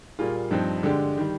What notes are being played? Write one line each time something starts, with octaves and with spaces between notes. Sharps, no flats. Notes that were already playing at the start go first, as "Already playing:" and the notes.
A#2 G3 A#3 F4 G#4
G2 F3 C4 D#4
D3 G#3 D4 G4
D#3 G3